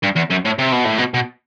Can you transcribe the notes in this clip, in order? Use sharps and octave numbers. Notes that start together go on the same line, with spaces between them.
G2
E2
F#2
A2
C3
B2
A2
B2
B2